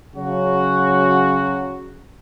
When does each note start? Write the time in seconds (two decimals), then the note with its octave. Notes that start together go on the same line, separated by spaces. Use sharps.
0.16 C#3 F#3 F#4